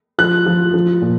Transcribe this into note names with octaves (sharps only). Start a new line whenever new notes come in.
F3 F#6
F3
F3
A#2